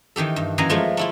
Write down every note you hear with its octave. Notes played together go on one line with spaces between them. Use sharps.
D#3 E3 G4 A4
G2
F#2 E3 A#3 D#5 G#5 A#5
F3 G#3 A3 F4
A3 E4 F4